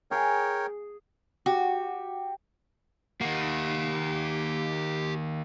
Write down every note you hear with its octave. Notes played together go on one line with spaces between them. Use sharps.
G#4 A#4 C#5 G5
F#4 G4
D#3 A#3 G4 F#5